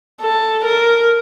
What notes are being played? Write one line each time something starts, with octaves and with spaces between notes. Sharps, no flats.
A4
A#4